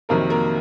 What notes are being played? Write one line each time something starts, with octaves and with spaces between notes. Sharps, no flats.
F2 C3 D#3 F#3 A#3 A#4
A#3 A#4